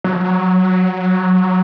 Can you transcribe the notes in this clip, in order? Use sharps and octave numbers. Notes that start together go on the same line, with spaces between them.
F#3
F3
F#3